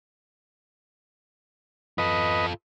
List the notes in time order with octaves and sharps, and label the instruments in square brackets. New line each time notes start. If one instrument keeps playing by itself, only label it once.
[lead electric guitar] F4 A4 [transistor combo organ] B4 D#5